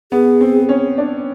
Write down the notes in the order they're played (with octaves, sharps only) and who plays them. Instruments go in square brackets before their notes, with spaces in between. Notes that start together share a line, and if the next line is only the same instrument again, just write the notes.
[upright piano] B3 [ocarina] G#4
[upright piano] C4
C#4
D4